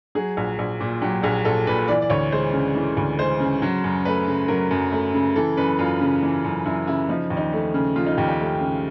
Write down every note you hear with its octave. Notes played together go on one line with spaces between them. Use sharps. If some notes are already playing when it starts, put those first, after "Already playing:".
F#3 G#4
A#1
A#1
A#2
F#3 G4
A#1 G#4
A#1 A4
A#2 B4
E3 D5
D5
D2 C#5
G#3 C5
C#3
E3
D2
G#3 C5
C#3
F#3
F#2
A3 B4
C#3
F#3 A#4
F#2
A3
C#3
E3 A4
F#2 B4
F#2 F4
C#3
E3
F#2
F#2 E4
C#3 E4
F3 D#4
D#2
D#4
A3
C#3
F3 F4
D#4
D#2 G4
G4
A3
C#3